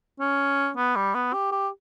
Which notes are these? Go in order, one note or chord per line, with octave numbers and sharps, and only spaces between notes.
C#4
B3
G3
B3
G4
G4